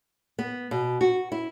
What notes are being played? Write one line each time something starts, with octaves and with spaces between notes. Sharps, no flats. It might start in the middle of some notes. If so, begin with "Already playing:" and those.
B3
B2
F#4
E4